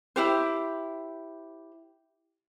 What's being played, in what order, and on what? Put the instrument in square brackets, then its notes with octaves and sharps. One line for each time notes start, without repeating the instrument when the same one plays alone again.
[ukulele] E4 G4 C5